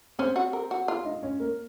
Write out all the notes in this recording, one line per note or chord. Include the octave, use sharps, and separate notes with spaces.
C4 C#4 C5
F#4
A#4
F#4
F4
D#4 D#5
C#4 C#5
A#3 A#4